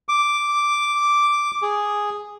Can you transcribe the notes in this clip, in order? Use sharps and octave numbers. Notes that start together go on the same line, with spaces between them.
D6
G#4